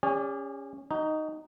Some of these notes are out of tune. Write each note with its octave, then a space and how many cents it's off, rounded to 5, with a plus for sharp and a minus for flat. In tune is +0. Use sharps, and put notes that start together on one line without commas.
C#4 +0 G#4 -45 D5 -15
D#4 +0 F#4 +40